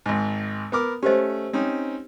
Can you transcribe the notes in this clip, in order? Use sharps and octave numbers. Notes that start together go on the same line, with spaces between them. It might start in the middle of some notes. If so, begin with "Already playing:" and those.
G#1 G#2
B3 A#4 D6
A3 C#4 G4 C5 D#5
C4 C#4 D#4